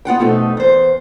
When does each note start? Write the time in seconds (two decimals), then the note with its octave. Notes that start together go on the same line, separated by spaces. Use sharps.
0.05 B3 F4 F#5 G5
0.19 F2 B2 A3 D#4
0.57 E2 C5